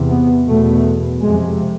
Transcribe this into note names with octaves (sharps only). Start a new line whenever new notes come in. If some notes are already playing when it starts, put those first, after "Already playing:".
Already playing: E2 C3
B3
E2 B2 A3
F2 C3 G#3